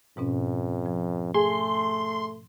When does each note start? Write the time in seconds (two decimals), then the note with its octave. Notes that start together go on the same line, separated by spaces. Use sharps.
0.17 F2 G#2 B2 C#4
0.86 F3
1.34 A3 G#4 C6